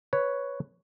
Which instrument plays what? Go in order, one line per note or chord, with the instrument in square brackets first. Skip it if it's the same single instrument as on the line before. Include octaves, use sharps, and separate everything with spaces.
[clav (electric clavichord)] B4 C#5